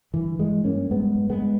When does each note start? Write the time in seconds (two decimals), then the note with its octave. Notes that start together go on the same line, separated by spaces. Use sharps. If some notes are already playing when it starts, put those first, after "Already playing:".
0.14 G2 E3
0.39 G2 E3 G#3
0.64 G2 A#3 C#4
0.91 G2 G#3 B3
1.16 G2
1.30 G#3 B3